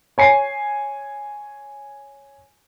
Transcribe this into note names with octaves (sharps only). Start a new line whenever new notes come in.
C#5 G#5 C7